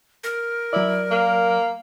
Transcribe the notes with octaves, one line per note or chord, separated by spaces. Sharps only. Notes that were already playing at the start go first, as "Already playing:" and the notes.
A#4
F#3 E4 D5
A#3